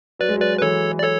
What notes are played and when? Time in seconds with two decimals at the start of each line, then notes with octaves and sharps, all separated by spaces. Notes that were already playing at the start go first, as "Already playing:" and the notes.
0.19 F#3 B4 D5
0.29 G#3
0.37 F#3
0.41 B4 D5
0.58 B4
0.62 E3 A4 C#5
0.99 D5
1.03 A4 C#5